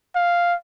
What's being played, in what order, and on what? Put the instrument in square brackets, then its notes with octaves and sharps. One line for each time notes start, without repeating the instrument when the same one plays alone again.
[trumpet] F5